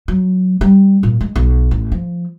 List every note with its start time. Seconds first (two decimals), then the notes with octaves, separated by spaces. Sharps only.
0.08 F#3
0.61 G3
1.03 A#2
1.21 G#3
1.36 B1
1.71 A1
1.92 F3